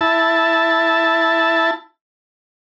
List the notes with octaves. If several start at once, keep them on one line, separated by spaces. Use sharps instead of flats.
E4 A5